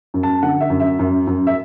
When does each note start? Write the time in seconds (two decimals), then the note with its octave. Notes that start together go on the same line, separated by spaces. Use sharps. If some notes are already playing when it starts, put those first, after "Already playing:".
0.14 F#2
0.23 A5
0.43 D3 F#5
0.60 E5
0.70 F#2
0.80 E5
0.99 F#2
1.27 F#2
1.47 E5